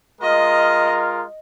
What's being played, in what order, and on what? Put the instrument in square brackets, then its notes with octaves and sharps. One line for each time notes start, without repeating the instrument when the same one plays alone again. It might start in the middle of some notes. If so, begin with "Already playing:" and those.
[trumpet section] G#3 F4 A#4 [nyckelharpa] D#5